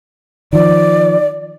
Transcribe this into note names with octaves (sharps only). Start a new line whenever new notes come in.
D#3 F3 D5